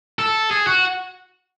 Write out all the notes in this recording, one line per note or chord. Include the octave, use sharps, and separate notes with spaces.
A4
G#4
F#4